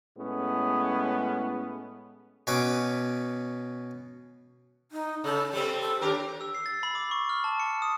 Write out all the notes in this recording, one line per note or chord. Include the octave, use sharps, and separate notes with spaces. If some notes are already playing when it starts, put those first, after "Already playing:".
A2 G#3 B3 C#4
B2 C#4 B4 D6
D#4
C#3 A4
G3 C4 A4
A4
D#2 D4 G4 A#4
E6
C7
A6
B5
D6
C#6
F6
A5
C#7
D#6